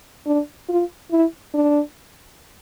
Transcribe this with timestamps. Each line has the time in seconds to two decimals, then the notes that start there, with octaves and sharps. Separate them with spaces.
0.27 D4
0.69 F4
1.11 E4
1.54 D4